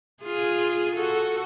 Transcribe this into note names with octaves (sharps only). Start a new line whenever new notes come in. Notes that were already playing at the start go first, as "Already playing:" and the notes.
F4 G#4
F#4 A4